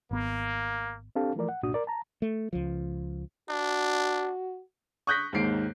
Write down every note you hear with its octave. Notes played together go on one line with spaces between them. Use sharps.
G#1 A#3 B3
C4 D4 G4 A4 F5 A5
E3 F3 A3 A#4 D5
F#5
C2 G2 A#2 D4 F#4 D#6
A#4 D5
A5 A#5
A3
C#2 F3
D4 F#4
C#6 D#6 F#6 G6 A#6 B6
D#2 G#2 D#3 C7 D7